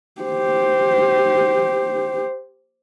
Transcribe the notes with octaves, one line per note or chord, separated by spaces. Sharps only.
G4 C5